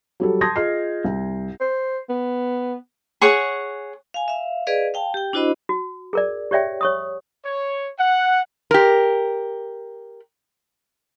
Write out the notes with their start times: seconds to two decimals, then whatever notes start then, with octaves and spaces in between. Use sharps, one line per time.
0.20 F#3 G3 A4
0.41 A5 C6 D#6 G6 G#6 A#6
0.56 F4 G#4 D#5 F6 C7
1.05 C2
1.61 C5
2.09 B3
3.21 G#4 C#5 F#5 C#6
4.14 F5 G#5
4.28 E5 F5
4.67 G#4 B4 D5 D#5 F5
4.94 F5 G5 A5
5.14 G4 G5
5.33 D4 E4 F#4 C5 D#5 B5
5.69 F#4
6.13 G#4 A#4 D5
6.51 G4 C#5 D5 E5 G5
6.81 C#5 C#6 D#6
7.45 C#5
7.99 F#5
8.71 G4 A#4